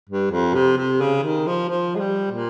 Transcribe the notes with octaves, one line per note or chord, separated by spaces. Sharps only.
G2
F2
C3
C3
C#3
D#3
F3
F3
G#3
G3
A#2